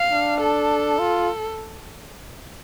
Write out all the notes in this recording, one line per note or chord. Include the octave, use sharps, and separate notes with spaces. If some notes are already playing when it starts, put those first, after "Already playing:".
Already playing: F5
D4
A4
F4